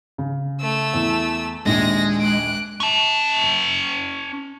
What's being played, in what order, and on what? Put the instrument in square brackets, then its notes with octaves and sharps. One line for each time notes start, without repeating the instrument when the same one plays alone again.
[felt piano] C#3
[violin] A3 E6
[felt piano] E2
[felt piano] A#1 D#2 [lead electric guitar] G#3 [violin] A#6
[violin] F#6 D7
[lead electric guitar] C#4 A5